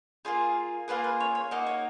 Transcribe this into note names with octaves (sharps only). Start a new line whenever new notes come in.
A#3 F4 G#4
A#3 F4 G#4 B4
B4
C#5
C#5
A#3 D#4 F#4
C#5